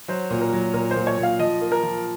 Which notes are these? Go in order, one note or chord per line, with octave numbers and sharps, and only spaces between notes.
F#3 C5
A#2
A#4
F#3
A#2 A#4
A#2 C5
C#5
A#2
F5
F3 D#5
A#3
A#4
F3